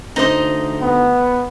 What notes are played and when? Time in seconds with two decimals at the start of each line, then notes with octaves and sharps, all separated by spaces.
0.16 D2 D#4 C5 D#5
0.82 B3